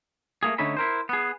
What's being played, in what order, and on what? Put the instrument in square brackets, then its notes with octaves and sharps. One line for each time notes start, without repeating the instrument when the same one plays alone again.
[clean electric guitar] A3 A#3 G#4
D3 A3 C#4 D#4 A4 B5
E4 A#4 C5
B3 G#4